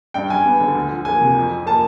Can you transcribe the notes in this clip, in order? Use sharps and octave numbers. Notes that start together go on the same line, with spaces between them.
G2 G5
G3 G#5
B3
D3
D2
F3
A#3 G#5
C3
F2
F3
A#3 A5